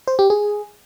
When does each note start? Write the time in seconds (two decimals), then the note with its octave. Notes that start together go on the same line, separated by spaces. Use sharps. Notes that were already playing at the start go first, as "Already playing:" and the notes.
0.08 C5
0.19 G4
0.30 G#4